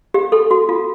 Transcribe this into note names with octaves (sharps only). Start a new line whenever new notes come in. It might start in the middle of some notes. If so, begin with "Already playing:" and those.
G4
A4
F#4
F4